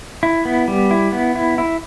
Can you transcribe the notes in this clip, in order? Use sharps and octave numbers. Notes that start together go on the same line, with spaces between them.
E4
B3
G3
E4
B3
E4
E4